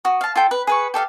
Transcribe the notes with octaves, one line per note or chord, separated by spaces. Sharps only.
F#4 D#6
F5 A5
F4 A4 G5 C6
B4
G#4 B4 C#6
G4 A4 E5 F5